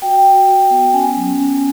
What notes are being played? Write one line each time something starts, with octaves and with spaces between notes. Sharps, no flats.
F#4 G5
F#4
F#4
B3
C#4 G#5
F#3
C#4